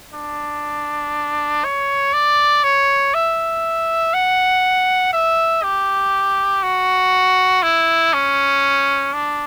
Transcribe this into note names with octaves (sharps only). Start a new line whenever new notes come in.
D4
C#5
D5
C#5
E5
F#5
E5
G4
F#4
E4
C#4
D4